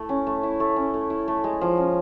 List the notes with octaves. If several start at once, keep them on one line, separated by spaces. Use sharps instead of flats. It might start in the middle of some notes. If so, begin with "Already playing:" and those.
Already playing: A3 E4
C#4
A3
E4
A3
C#4
A3
E4
A3
G#3
F3
C#4